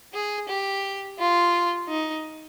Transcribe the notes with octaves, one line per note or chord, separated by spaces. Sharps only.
G#4
G4
F4
D#4